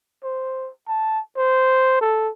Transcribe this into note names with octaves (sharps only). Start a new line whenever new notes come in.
C5
A5
C5
A4